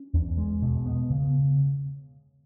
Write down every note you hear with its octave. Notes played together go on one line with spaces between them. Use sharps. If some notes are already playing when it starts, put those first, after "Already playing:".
Already playing: C#4
E2
G#3
B2
B3
C#3